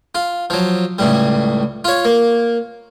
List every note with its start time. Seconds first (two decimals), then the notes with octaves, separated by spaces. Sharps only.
0.15 F4
0.50 F3 F#3
0.99 C#2 A2 G3
1.85 F4 C#5
2.05 A#3